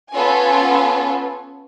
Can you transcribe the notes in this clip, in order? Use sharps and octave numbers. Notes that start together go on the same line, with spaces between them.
B3 C#4 F4 A4 B4 G#5